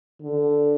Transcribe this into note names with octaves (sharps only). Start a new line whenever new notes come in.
D3